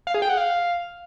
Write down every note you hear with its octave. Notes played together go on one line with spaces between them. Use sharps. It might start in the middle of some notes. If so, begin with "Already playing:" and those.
F5
G#4
G5
F#5
F5